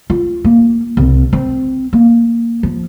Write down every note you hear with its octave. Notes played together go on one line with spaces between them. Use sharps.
F4
A#3
C2
C4
A#3
F3